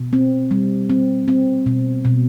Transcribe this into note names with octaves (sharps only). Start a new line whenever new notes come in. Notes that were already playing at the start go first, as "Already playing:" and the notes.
Already playing: B2
C4
G3
C4
C4
B2
B2